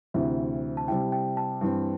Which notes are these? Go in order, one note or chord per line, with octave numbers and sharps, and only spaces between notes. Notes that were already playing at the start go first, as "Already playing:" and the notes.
D2 C3 E3 C4 E4 E5
A5
C3 G3 E4 G5
G5
A5
G2 E3 C4